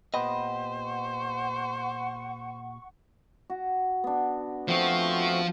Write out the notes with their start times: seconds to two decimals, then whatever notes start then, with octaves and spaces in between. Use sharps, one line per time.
0.14 A#2 B3 G4 C5 D#5
0.82 F#5 C#6
3.50 F#4
4.04 B3 D4
4.68 F3 A3 C4 F#4